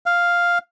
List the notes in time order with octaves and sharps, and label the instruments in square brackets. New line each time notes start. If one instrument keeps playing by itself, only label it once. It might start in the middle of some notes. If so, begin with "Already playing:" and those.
[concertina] F5